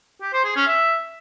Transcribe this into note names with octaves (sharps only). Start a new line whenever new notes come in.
G4
C5
G#4
C#4
E5